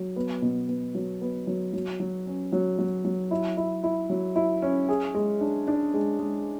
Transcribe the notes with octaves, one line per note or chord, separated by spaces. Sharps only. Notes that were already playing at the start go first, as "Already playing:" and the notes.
Already playing: F#3
B3
B2
B3
F#3
B3
F#3
F#3
F#3
C#4
F#3
F#3
F#3
E4
E4
E4
F#3
E4
C#4
G#4
G#3
D4
D4
G#3
G#3